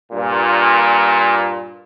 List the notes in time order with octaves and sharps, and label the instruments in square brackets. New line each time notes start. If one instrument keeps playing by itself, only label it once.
[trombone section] G2 A#2